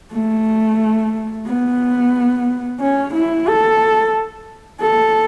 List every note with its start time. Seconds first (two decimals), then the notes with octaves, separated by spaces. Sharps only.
0.12 A3
1.47 B3
2.81 C#4
3.15 E4
3.48 A4
4.81 A4